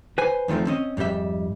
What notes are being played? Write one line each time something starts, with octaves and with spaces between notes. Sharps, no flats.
B4 C5 G#5
E2 D#3 F3 A3 C4
C4 C#4 D#5
F2 G#2 G3 G4 E5